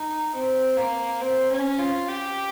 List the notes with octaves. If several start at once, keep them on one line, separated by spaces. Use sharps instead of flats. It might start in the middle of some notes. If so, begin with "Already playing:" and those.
Already playing: D#4
C4
A#3
C4
C#4
F4
G4